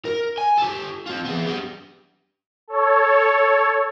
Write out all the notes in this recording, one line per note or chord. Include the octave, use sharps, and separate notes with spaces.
A#4
G#5
G4 A4
C4 F4
B3 G#4
G4 B4
A4 C#5